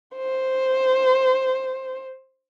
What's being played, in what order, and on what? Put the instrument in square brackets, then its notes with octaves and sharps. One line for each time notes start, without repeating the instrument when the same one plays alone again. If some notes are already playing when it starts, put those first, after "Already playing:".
[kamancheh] C5